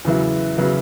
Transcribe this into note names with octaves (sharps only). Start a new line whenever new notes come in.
E2 C#3 F#3 B3 E4
C#3 F#3 B3 E4